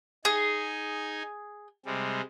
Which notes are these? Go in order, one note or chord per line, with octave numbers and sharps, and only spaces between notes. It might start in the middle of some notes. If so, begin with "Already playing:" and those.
D#4 G#4 G#5
C3 G3 G#3